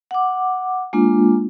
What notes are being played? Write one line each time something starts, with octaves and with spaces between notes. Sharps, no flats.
F#5 D6
G#3 A#3 D4 F4